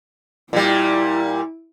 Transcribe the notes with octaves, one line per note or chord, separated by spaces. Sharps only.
A#2 G3 E4